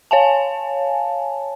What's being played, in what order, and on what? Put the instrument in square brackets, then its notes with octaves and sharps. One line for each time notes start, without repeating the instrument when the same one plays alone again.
[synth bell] C#5 F5 G#5 A5